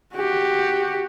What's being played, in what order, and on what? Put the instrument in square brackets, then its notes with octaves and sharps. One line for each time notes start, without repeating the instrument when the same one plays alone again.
[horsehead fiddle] F#4 G4